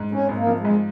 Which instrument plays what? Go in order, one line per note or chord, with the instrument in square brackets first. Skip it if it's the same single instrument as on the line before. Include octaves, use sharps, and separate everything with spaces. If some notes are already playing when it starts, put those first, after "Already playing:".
Already playing: [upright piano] G#2
[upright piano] G#1 [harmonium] C#4
[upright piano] G#1
[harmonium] A#3
[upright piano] F3
[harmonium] G#3
[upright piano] G#2